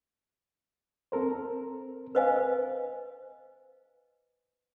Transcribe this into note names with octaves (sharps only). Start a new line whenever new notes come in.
C4 A4 A#4 C5
B4 C5 D#5 F5 G#5